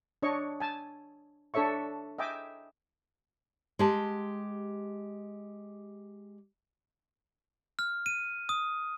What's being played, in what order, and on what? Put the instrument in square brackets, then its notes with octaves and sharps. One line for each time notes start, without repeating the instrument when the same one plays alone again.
[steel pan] D4 C#5 D#5 C#6
G#5 A5
D4 A4 C#5 E5 C#6
D#5 E5 G5 G#5 D6
[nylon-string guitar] G#3 G4 A5
[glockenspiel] F6
D#7
D#6